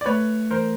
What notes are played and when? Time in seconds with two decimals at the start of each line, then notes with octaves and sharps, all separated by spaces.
0.01 D5
0.06 A3 B4 C#5
0.51 E3 A#4 C5